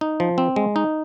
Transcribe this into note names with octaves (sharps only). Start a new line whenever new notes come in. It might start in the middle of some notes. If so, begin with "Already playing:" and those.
D#4
F3
C4
G#3
D#4